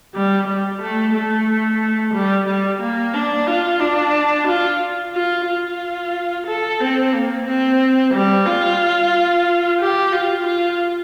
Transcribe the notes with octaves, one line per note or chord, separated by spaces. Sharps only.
G3
G3
A3
A3
G3
G3
A#3
D4
F4
D4
F4
F4
F4
A4
C4
A#3
C4
G3
F4
G4
F4
F4